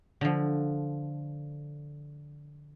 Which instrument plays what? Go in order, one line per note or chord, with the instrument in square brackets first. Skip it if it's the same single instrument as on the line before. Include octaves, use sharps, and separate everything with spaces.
[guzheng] D3 F3